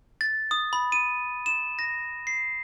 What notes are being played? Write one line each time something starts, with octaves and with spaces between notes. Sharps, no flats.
A6
D#6
B5
D#7
E7
A#6
C7